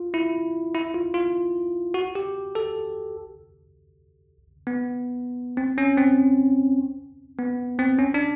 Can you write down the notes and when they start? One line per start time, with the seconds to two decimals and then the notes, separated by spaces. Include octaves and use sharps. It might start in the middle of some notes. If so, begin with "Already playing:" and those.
Already playing: F4
0.14 E4
0.75 E4
0.94 F4
1.14 F4
1.94 F#4
2.15 G4
2.55 A4
4.67 B3
5.57 C4
5.78 C#4
5.97 C4
7.39 B3
7.79 C4
7.99 C#4
8.14 D4